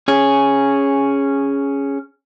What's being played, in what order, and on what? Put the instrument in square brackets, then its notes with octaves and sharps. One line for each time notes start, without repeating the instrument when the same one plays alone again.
[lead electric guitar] C#4 G#4